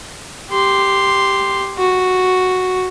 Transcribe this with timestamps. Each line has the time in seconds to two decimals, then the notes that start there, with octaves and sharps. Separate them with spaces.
0.51 G4 C6
1.77 F#4